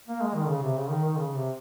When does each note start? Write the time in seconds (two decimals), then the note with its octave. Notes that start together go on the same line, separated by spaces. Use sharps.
0.07 A#3
0.21 G#3
0.35 D#3
0.48 C#3
0.62 C3
0.77 C#3
0.90 D#3
1.04 D#3
1.18 C#3
1.35 C3